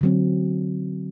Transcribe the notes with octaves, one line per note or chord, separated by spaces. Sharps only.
D3 F#3 C4